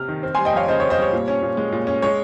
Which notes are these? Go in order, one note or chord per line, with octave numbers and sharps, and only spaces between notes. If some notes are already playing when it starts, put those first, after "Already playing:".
Already playing: C3 F6
D#3
C4
G#5 C6
G3
D#5 G5
F2 C#5 F5
C#3 C5 D#5
C#5
C4
C5 D#5
G3 C#5
A#2
C#4
A#2
G#3
A#2
C#4
G#3 C#5